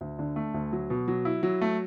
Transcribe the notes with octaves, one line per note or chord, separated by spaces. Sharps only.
D2
D3
A3
D2
F#3
B2
F#3
E4
F#3
A3